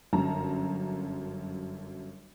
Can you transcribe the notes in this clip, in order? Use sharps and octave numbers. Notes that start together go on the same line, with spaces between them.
G1 F#2 A5 A#5